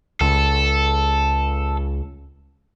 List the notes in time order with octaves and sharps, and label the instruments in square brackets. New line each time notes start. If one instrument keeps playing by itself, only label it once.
[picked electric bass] C#2 [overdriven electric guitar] A4